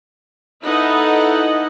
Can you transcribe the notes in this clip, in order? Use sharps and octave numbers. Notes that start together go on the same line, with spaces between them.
D#4 E4 A4 B4 D#5 F#5